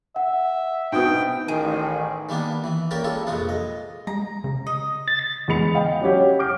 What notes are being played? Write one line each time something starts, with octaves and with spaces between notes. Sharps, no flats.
E5 F#5
G#2 B2 D4 F#4 G5 D#6
A1 D#3 G#4
D#3 G3 A#3 B3 D4
E3
A#3 C#4 G4 A#4 D5
G3 G#3 F4 A4
A#1 F2 C3 G#3 F4
D#5
G#3 A#5
C#3
D#5
A6
E2 G#3 B5 C#7 F7
D#5 F5 G5
F#3 C#4 G4 C#5
D6 F6 G6 D7